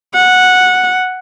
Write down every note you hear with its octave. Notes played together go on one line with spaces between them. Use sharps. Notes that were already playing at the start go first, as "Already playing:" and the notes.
F#5